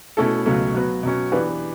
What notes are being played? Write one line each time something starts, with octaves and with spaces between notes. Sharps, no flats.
B2 A3 C#4 E4 A4
C#2 B2 F#3 A3 C#4
B2 F#3 B3 F#4 B4
B2 F#3 C#4
E3 B3 D4 G4 B4